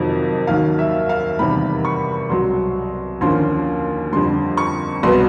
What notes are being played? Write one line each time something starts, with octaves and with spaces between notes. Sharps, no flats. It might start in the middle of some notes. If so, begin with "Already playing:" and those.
Already playing: F2 C3 D#3 F#3
D#2 D#3 F#3 F5
E5
F5
E2 C3 D#3 G3 B5
C#6
C2 B2 F#3 C6
D#2 D3 F3 A#3 C#4 C6
F2 D3 G3 C6
C#6
C2 B2 F#3 B3 C6